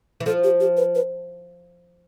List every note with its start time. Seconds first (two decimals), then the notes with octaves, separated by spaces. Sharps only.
0.20 E3
0.26 F3 A4
0.44 G4
0.60 G4
0.77 B4
0.95 B4